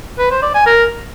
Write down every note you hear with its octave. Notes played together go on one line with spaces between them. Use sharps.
B4
C5
D5
G#5
A#4